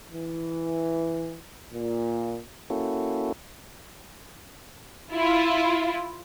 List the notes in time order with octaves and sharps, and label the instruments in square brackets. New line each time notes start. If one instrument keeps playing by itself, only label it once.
[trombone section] E3
A#2
[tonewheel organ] A#3 C#4 E4 F#4 A4
[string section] E4 F4